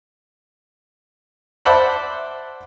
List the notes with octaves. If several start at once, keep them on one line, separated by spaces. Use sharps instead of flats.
C5 D5 E5 F#5 A5 B5